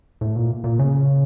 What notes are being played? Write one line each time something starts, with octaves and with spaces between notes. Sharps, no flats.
A2
A#2
A#2
C#3